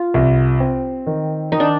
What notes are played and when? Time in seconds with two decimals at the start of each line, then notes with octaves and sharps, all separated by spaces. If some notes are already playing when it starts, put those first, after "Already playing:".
Already playing: F4
0.14 C2
0.60 C4
1.07 D#3
1.52 D#3 D#4
1.60 D4